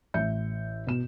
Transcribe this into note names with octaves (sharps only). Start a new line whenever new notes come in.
A1 E5 G6 C#7
B2 E7